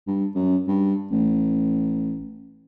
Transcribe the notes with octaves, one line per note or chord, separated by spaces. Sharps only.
G2
F#2
G2
A1